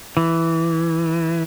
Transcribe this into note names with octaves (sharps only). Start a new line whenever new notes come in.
E3